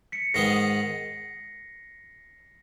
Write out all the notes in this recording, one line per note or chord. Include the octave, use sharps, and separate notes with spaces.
B6 C#7
G#2 D#3 G#3 B3 A#6 C7